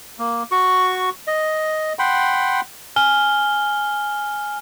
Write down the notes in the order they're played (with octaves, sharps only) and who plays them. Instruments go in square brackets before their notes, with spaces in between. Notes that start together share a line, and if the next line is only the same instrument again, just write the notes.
[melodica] A#3
F#4 C#6
D#5
F#5 G5 B5 C6
[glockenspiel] G#5 F6 G7